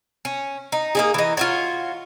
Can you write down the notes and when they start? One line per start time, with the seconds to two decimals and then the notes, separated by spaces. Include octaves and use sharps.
0.25 C#4
0.72 D#4
0.95 A#3 D#4 G#4
1.14 E3 D#4
1.37 F4 F#4 C#5